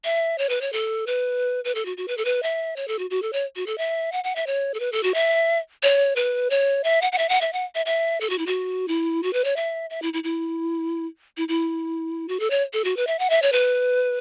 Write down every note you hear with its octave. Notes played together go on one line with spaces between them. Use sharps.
E5
C#5
B4
C#5
A4
B4
B4
A4
F#4
F#4
B4
A4
B4
E5
C#5
A4
F#4
F#4
A4
C#5
F#4
A4
E5
F#5
F#5
E5
C#5
A4
B4
A4
F#4
E5
C#5
B4
C#5
E5
F#5
F#5
E5
F#5
E5
F#5
E5
E5
A4
F#4
E4
F#4
E4
F#4
B4
C#5
E5
E5
E4
E4
E4
E4
E4
F#4
A4
C#5
A4
F#4
B4
E5
F#5
E5
C#5
B4